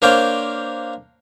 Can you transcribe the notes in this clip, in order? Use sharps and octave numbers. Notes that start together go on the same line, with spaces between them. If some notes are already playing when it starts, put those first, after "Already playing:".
A#3 D4 C5 C#5 F5 G5